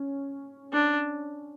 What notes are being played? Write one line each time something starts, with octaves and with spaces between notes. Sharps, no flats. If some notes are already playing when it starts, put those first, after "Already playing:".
Already playing: C#4
D4